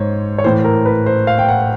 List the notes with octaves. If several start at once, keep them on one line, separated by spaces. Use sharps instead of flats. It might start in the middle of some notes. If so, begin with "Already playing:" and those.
Already playing: G#2 C5 C#5
C#5
A2 E3 C5
A#4
B4
C5
F5
G5
F#5